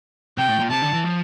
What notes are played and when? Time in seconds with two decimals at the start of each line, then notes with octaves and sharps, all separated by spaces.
0.38 C3 G5
0.48 A2
0.59 A#2
0.71 C3 A5
0.82 D3
0.93 E3
1.04 F3